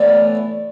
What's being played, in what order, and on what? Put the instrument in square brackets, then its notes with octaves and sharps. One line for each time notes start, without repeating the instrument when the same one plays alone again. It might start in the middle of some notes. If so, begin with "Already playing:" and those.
Already playing: [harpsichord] A2 E3 B3 [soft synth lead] D5